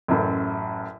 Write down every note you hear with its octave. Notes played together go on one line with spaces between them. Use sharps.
A1 F#2